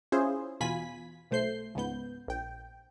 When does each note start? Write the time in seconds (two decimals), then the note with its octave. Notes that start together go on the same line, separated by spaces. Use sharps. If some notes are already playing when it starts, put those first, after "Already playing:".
0.12 C#4 E4 F4 G#4 C5
0.60 E2 B2 F4 G#5 B5 B6
1.31 B1 A3 C5 G6 C7
1.75 C#2 G#2 B3 G6
2.28 A#1 G5